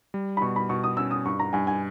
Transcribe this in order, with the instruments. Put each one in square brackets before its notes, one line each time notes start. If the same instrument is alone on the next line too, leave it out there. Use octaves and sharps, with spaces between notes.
[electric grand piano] G3
[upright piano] B5
[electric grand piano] B2 [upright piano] C#6
[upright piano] B5
[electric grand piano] B2 [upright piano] C#6
[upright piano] D#6
[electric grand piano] C#4 [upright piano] E6
[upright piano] D#6
[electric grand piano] G2 [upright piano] C#6
[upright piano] A#5
[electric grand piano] G2 [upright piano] G#5
[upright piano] G#5